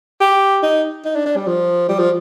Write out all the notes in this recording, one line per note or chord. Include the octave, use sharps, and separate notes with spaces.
G4
D#4
D#4
D4
D4
G3
F3
G3
F3